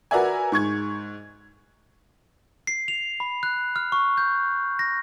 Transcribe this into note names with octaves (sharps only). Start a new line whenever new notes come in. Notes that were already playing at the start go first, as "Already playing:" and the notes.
F#4 A#4 B4 D5 E5 G#5
G#2 C#6 G#6
C7
F7
B5
F#6
F6
C#6
G6
A#6